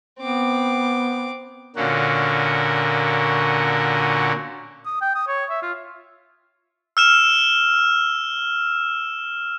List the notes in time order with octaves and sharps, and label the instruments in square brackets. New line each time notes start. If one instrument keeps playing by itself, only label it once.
[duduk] B3 [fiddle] C4 D6
[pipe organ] A#2 D3 A#3 C#4 F#4
[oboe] D#6
G5
D#6
C#5
E5
F4
[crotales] E6 F6 E7